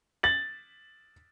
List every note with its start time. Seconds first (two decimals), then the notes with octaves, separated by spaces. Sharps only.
0.23 A6 F#7